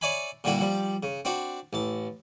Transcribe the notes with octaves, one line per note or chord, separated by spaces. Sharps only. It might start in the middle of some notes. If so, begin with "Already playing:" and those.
C#5 D5 E5 G#5 B5
A#2 D3 G3 E4 F#4
F3 G3
C#3
C4 D4 F#4
A1 A5